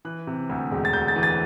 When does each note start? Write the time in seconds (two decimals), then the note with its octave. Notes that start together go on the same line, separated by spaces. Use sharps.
0.05 E3 F#6
0.27 C3
0.49 D2
0.72 E1
0.85 A6
0.93 D2 G6
1.08 A6
1.16 E3
1.23 A6